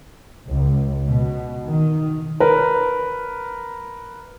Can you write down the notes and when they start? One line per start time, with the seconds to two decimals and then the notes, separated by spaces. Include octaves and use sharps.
0.48 C#2
1.06 B2
1.66 D#3
2.40 A#4 B4